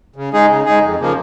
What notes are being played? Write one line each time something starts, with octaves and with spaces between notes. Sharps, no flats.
C#3
G#3 D#4 G#4
C#3
G#3 D#4 G#4
F2
C#3 F3 A#3